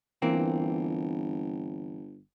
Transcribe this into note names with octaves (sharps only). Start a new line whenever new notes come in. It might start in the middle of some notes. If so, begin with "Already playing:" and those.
G1 E3 A#3 C4